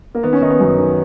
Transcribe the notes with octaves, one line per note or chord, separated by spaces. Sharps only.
A#3
D#3 B3
C#4
D#3 D#4
B3
F#2
D#3